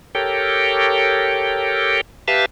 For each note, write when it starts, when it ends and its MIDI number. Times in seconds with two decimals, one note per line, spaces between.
0.15 2.01 67
0.15 2.01 69
0.15 2.01 70
0.15 2.01 73
0.15 2.01 79
2.28 2.46 67
2.28 2.46 71
2.28 2.46 76
2.28 2.46 77
2.28 2.46 81